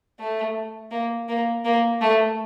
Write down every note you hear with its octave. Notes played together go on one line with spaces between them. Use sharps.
A3
A#3
A#3
A#3
A3